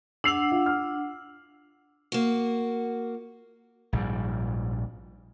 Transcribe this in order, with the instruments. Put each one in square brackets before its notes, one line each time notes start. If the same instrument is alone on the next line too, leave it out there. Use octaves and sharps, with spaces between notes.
[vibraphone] D4 F#5 [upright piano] E6 C7 F7
[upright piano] F4
F6
[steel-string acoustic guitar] A#3 F#4
[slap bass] A#1 G#2 G3